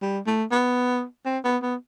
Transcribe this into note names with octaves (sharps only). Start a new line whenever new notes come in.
G3
A3
B3
C4
B3
B3